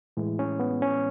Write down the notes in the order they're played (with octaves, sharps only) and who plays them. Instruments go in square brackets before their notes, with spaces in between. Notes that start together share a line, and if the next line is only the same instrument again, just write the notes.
[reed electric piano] A2 E3 G#3
C#4
B3
C#4